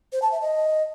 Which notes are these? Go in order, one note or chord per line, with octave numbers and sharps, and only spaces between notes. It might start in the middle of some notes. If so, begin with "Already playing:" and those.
C5
A5
E5
D#5